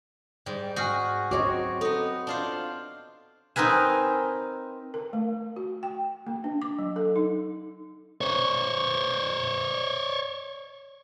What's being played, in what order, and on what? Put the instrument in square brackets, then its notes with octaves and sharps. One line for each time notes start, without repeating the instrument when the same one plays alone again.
[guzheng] G#2 G3
[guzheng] F#4 G#4 [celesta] G#5 F6 G6
[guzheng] F#3 C4 [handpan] F#4 C#5 D#5 [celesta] D6
[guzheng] B3 D#4 [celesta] A4
[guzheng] D4 F4 C5
C4 D#4 A#4 B4 G#5
[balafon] A#4
A3
F#4
G5
A#3
D4
D6
F#3
A4
D#4
[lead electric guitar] C5 C#5